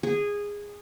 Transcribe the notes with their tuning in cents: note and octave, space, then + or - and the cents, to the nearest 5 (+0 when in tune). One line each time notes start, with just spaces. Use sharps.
G#4 -15